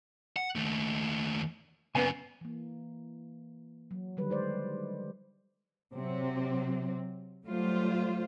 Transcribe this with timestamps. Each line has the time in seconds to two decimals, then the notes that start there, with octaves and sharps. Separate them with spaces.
0.36 F#5
0.55 D#2 A3
1.95 F#2 C#3 B3 G#5
2.41 E3 A#3
3.91 F#3
4.17 D3 D#3 G3 B4
4.30 G#3 C5 D5
5.93 C3 F#3 C4
7.44 F#3 G3 A3 F4 C5